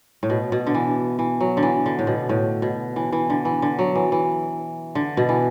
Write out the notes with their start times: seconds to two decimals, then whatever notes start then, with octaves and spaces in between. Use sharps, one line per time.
0.23 A2
0.30 B2
0.52 B2
0.67 D3
0.74 E3
1.19 E3
1.40 F#3
1.57 D3
1.63 E3
1.86 D3
1.99 A2
2.07 B2
2.29 A2
2.62 B2
2.96 E3
3.12 E3
3.30 D3
3.45 E3
3.62 D3
3.79 F#3
3.95 E3
4.12 E3
4.95 D3
5.17 B2
5.29 E3